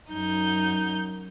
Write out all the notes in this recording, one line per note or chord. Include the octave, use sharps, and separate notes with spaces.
F#2 D#4 G6